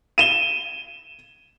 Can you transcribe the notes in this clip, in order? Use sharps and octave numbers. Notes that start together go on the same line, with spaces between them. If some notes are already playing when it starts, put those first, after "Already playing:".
D#7 E7 G7